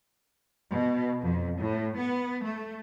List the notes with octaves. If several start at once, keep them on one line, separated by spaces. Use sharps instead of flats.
B2
F2
A2
B3
A3